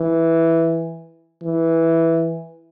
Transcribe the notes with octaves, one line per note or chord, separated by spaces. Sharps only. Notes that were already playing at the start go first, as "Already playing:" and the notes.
Already playing: E3
E3